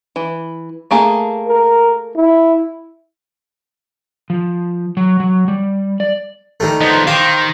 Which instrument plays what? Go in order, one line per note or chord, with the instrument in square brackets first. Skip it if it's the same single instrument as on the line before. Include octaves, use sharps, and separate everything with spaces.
[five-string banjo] E3
A3 A#3 G#4
[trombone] A#4
E4
[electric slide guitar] F3
F#3
F#3
G3
D5
[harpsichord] D#3 G3 A3
[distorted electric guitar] F3 B3 [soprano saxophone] D#4 [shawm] C5
[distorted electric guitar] D#3 [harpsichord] G4 [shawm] C5 [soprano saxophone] F5